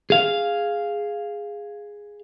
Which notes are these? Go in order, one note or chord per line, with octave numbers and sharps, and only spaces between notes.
G#4 F5